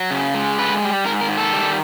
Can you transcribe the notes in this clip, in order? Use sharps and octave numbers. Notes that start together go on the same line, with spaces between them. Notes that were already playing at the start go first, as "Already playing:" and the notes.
Already playing: F#3
C#3
G#3
D3 B4
G3
G#2 A#4
A#4
D#3
A4
G3